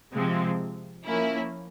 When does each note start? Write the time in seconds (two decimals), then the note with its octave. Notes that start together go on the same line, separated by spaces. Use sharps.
0.13 C3 F3 G#3 C4
1.05 F3 A#3 C#4 E4